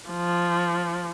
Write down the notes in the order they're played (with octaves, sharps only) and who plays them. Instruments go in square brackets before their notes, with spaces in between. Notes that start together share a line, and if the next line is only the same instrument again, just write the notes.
[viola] F3